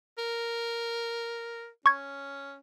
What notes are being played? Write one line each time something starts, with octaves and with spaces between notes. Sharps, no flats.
A#4
C#4 C#6 G#6